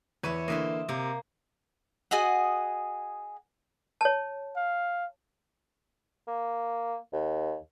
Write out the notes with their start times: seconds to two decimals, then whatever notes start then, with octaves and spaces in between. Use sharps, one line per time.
0.23 E2 B4 C#5 E5 D#7
0.48 D3 E3 A#3 D#5 E5 C6
0.89 C3 A#3
2.11 F#4 G#4 D#5 F#5
4.01 C#5 A5
4.57 F5
6.28 A#3
7.13 D#2